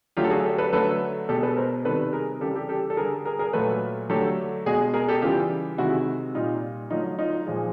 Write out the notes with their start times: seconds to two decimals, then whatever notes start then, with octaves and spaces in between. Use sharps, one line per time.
0.17 D3 F#3 A3 F4 G4
0.24 A4
0.30 F#4 G#4
0.45 G4 A4
0.58 A4 B4
0.73 D3 F#3 A3 A4 B4
1.29 B2 G#3 G4 A4
1.43 A4 B4
1.57 A#4 C5
1.85 C3 D#3 G3 A4 B4
2.13 G#4 A#4
2.41 C#3 E3 G3 G4 A4
2.55 G4 A4
2.69 G4 A4
2.90 A4
2.97 D3 G3 G#4 A#4
3.25 G#4 A#4
3.39 G#4 A#4
3.53 A#2 F#3 A3 A4 B4
4.09 D3 F#3 A3 G4 A4
4.66 B2 G#3 F#4 G#4
4.94 G#4 A#4
5.09 G4 A4
5.22 C#3 E3 G3 F4 G4
5.78 C3 D#3 G#3 E4 F#4
6.34 A#2 G3 D#4 F4
6.90 D3 F#3 A3 D#4 F4
7.19 D#4 F4
7.47 A#2 F3 G#3